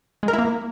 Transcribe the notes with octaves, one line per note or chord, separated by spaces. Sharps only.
G#3
A#4
E4
A#3